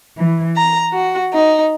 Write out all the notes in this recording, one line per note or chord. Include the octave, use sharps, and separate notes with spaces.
E3
A#5
F#4
D#4